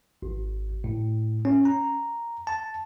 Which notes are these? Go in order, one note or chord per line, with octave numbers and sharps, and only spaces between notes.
G#1
A2
C#4
A#5
A5